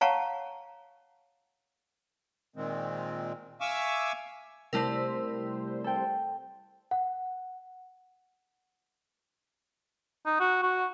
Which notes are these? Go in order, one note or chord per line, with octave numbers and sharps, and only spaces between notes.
C#5 F5 F#5 A5 A#5 C#6
A#2 D#3 G#3 C4
E5 F5 G#5 C#6 D6 E6
C3 G3 A3 E4 A#4 C5
A4 G5
F#5
D#4
F#4
F#4